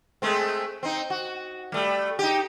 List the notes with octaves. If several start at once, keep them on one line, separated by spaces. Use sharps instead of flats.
G#3 A3 C4
C4 D#4
F#4
G3 A3
D#4 G4